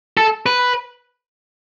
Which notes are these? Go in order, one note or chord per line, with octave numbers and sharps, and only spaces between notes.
A4
B4